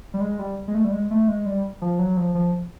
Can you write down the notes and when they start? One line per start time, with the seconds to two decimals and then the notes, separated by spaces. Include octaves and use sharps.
0.14 G3
0.21 G#3
0.39 G3
0.68 G#3
0.75 A3
0.85 G3
0.92 G#3
1.11 A3
1.28 G#3
1.46 G3
1.82 F3
1.99 F#3
2.17 F3
2.35 F3